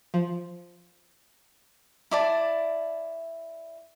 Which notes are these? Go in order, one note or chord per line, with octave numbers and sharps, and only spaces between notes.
F3
E4 D5 A5